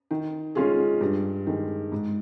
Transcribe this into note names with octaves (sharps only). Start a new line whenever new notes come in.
D#3
G#3 C#4 F4 G#4
G2
D#3 G#3
G#2